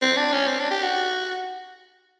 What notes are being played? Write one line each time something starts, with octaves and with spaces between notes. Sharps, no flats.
C4
D4
C#4
C4
D4
G4
F#4